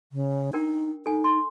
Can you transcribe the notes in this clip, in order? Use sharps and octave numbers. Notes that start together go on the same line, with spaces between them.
C#3
D4 D#4 A#4 G5
D#4 A4 G#5
C6